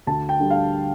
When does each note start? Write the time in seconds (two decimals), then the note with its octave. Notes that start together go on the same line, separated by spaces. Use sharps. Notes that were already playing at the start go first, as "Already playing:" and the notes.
0.07 D2 A5
0.29 G5
0.40 D3 G3
0.50 F5